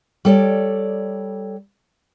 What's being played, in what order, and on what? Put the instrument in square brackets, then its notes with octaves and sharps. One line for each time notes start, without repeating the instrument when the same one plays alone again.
[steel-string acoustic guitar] G3 A4 C#5 D5